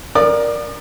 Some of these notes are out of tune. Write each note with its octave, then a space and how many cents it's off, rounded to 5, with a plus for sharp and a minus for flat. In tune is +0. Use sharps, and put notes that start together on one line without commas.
A#4 +15 D5 +0 D#6 -45